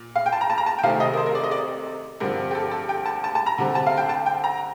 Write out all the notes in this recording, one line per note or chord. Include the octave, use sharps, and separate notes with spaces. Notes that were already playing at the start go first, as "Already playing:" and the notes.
Already playing: A#2
F5
G5
A5
A#5
A5
A#5
A5
G5
C3 D#3 A3 C4 F5
D#5
A#4
C5
A#4
D5
D#5
D5
G2 D3 F3 C4 A#4
G4
A4
A4
G5
A5
A5
A5
A#5
D3 G3 C4
A5
F5
G5
A5
G5
A#5